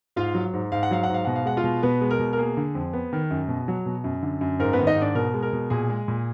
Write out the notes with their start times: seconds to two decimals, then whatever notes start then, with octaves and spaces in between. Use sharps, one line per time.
0.16 G#2 F4 F5
0.35 F#3
0.53 G#2
0.72 G#2 F5
0.83 F#5
0.91 F#3 F5
1.03 F#5
1.09 G#2 F5
1.25 B2 F#5
1.35 F5
1.46 G#3 F#5
1.57 F4 F5
1.64 B2
1.83 B2 B3 B4
2.01 G#3
2.11 A#4
2.19 B2
2.33 A#4
2.38 A#3 G#4
2.57 D3
2.75 F2
2.93 B3
3.13 D#3
3.31 F#2
3.48 B2
3.68 F#3
3.86 B2
4.04 F#2
4.23 D3
4.41 F#2
4.59 G#2 A#4
4.73 B3 B4
4.79 D#3
4.87 D#4 D#5
4.96 G#2
5.01 D4 D5
5.15 B2 A#4
5.34 G#3
5.42 A#4
5.53 B2
5.70 A#2 G#4
5.90 G#3
6.08 A#2